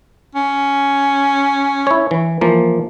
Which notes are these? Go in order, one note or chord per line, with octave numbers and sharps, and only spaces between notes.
C#4
E4 C#5
E3
E3 F3 A#3